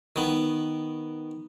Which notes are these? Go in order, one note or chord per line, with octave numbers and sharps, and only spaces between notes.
D#3 B3